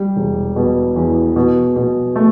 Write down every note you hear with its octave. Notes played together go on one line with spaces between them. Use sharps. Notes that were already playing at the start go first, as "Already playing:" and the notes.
Already playing: G3
E1
B2
E2
B2
B2
A3